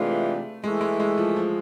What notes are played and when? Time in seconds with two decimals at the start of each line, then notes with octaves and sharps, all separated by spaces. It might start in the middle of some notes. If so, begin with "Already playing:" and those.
Already playing: C3 E3 G#3 A3 D4 F4
0.63 E3 G#3 A3 E4
0.81 G#3
1.00 G#3
1.18 F3
1.37 F3